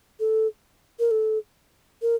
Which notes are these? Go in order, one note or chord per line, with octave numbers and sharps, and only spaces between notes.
A4
A#4
A4
A#4